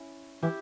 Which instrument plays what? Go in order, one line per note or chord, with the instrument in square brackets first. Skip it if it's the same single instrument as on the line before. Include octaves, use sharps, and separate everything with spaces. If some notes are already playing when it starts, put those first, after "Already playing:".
Already playing: [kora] C#4 E4
[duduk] E3 [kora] E4 G4